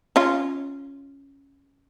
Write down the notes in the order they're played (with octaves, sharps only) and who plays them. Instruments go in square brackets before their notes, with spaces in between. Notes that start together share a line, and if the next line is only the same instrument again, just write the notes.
[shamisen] C#4 F4